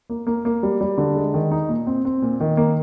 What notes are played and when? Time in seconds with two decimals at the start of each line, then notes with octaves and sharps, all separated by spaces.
0.10 A#3
0.27 A#3
0.45 A#3
0.63 G3
0.81 G3
0.98 D3
1.16 G#3
1.34 D#3
1.51 D#4
1.69 A#2
1.87 C4
2.05 C4
2.22 A#2
2.40 D#3
2.57 A#3